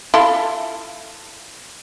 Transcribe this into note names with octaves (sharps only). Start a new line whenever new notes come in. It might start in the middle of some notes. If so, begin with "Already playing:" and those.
E4 F4 A4